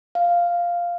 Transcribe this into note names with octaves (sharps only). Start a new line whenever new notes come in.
F5